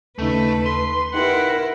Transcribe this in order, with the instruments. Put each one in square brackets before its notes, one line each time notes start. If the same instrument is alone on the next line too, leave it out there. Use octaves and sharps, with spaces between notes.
[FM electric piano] D#2 C#3 D#4 [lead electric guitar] A3 [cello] B4
[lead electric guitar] C6
[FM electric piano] D#4 G4 [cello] E4 A#4 [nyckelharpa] B4 F#5